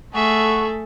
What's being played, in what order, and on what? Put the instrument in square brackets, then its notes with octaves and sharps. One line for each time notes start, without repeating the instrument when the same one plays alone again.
[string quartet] A3 [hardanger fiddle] G#4 E5 [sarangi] A4 [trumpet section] F#5 C#6